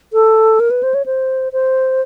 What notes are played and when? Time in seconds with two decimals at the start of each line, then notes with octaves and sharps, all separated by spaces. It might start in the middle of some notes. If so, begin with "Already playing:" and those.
0.13 A4
0.60 A#4
0.71 B4
0.83 C5
0.94 C#5
1.06 C5
1.53 C5